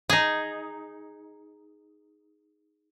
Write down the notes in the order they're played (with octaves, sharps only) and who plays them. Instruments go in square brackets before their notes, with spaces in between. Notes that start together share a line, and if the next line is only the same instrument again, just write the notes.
[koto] D#4 G#4